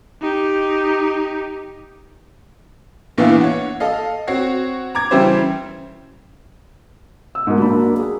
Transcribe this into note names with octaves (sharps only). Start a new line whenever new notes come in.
D#4 G4
A#1 E3 B3 D4 E4 F5
C#5 F#5
A4 D#5 F5
C4 F#4 C#5 C7
A#5 D6 G#6
C#3 E3 G3 E4 G4 C5
E6
G#2 B2 A#4
F#3 A#3 D4 B5
G#4